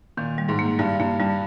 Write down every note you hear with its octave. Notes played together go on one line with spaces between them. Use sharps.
A#2 D#3
G3
G#2
A#3
G2 G3
G2 A#3
G2 G3